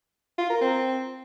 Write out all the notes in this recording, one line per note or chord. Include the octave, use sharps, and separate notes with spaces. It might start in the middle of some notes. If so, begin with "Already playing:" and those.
F4
A#4
C4